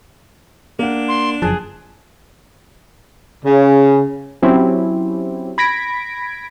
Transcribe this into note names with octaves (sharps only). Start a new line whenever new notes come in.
A#3 D4 F#5
C6
F#1 F#2 F3 G#4 A5 F#6
C#3
F#3 C4 C#4 E4 G4
B5 G#6 A#6 B6 D7